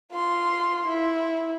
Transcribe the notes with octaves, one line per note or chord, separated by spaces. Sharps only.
F4 C6
E4